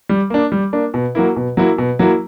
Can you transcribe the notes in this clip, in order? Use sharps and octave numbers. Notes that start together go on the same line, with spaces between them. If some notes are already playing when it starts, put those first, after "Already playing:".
G3
A#3 D4
G3
A#3 D4
B2
F#3 A#3 E4
B2
F#3 A#3 E4
B2
F#3 A#3 E4